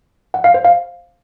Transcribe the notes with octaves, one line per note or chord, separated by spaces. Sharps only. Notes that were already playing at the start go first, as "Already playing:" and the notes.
F#5
F5
C5
F5